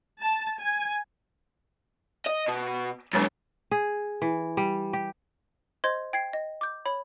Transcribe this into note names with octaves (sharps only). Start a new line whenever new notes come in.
A5
G#5
D#5
B2
F#2 D3 F#3 G#3 A6
G#4
E3
G3
G4
C5 D#5 C6 G#6
G5 G#6 C7
D#5
D6 G6
C#5 B5